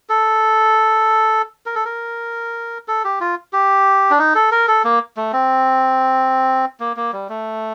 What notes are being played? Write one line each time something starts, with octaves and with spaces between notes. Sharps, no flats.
A4
A#4
A4
A#4
A4
G4
F4
G4
D4
D#4
A4
A#4
A4
A#3
A3
C4
A#3
A#3
G3
A3